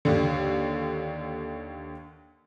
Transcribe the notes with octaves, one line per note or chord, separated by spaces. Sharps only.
D#2 D3